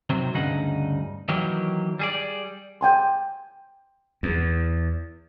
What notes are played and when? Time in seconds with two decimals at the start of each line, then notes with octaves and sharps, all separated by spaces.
0.10 C3 D#3 F#3 C4
0.34 D2 G2 C#3 D#4 F#5
1.29 D#3 E3 F#3 A#3 G4
1.99 G3 G#4 D5
2.81 G5 G#5 C6
4.23 E2